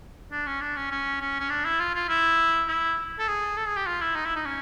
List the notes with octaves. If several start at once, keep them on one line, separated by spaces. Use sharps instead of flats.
D4
C#4
D4
C#4
C#4
C#4
C#4
D4
E4
F4
F4
E4
E4
A4
G#4
A4
G#4
G4
F4
E4
D#4
E4
D#4
C#4